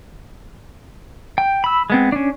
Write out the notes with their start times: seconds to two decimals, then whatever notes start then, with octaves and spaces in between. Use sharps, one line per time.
1.38 G5
1.64 B5 E6
1.90 G#3 B3 C4
2.12 C#4 D4